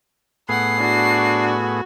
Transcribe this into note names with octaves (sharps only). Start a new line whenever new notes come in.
A2 B3 G#4 F#5 C7
D4 F#4